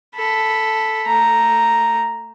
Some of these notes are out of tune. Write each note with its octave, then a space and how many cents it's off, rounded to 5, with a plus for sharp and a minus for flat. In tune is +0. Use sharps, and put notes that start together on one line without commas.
A4 +0 B5 -5
A3 +20 A#5 +0